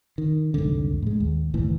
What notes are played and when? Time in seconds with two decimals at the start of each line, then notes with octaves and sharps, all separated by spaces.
0.18 D#3
0.54 C2 F2 G#2 D3
1.02 A2 G#3
1.20 D#2
1.54 F#1 D#2 A2 E3